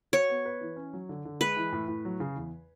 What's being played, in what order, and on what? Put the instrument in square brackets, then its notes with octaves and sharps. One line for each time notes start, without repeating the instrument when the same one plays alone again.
[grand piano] F#4 [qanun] C#5
[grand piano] B3
B4
E3
C#4
F#3
D3
D3
[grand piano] G#3 [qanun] B4
[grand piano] E3
A2
A2
F#3
C#3
E2